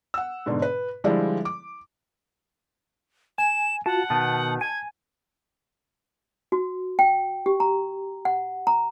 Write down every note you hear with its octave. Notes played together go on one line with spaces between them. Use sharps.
F#5 E6
G#2 B2 D3
B4
D3 F3 G3 G#3 D4 E4
D6
G#5 E7
F4 F#4 F#5 A5
B2 D#3 B3 A5
G#5 G#6
F#4
G5
G4
A#5
F#5
A#5